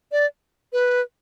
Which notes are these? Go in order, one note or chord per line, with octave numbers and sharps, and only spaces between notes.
D5
B4